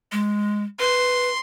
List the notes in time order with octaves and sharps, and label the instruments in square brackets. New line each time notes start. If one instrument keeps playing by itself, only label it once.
[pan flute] G#3
[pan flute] B4 [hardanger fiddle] C6